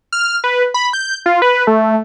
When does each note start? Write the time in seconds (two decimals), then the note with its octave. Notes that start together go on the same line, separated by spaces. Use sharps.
0.12 F6
0.44 B4
0.74 B5
0.93 G6
1.26 F4
1.42 B4
1.67 A3